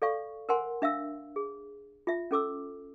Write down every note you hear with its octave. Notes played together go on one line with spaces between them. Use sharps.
A4 D5 F5 C#6
A#4 C5 F#5 G#5 C6
D4 E5 F5 E6
G#4
F4 E5
C#4 A4 D6 E6